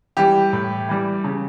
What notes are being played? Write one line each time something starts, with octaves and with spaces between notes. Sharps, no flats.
E3 G3 G4
A2
E3 G3
C#3